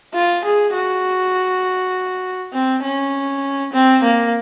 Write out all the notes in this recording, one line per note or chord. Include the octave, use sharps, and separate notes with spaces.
F4
G#4
F#4
C4
C#4
C4
A#3